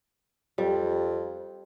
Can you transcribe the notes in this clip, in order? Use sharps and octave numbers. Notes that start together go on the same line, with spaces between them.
F2 G3